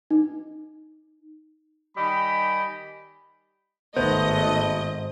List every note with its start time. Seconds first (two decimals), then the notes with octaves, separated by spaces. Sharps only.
0.11 D#4
1.97 D#3 G3 G4 D#5 G#5 B5
3.97 G#1 A3 B3 C5 D#5